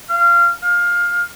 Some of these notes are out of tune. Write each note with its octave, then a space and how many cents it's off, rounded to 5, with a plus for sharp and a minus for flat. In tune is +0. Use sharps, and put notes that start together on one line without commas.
F5 -20
F5 +20